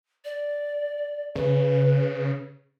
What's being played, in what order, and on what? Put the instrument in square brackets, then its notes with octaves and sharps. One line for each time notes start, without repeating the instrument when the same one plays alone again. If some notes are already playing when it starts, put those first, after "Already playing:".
[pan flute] D5
[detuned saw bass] C#3 [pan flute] B4